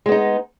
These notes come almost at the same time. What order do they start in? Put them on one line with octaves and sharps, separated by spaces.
G#3 B3 D#4